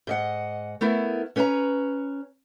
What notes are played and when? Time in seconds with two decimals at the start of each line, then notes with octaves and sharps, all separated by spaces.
0.07 G#2 D#5 F#5
0.81 A3 B3 E4 A#4
1.36 C#4 B4 C#5 E5 A#5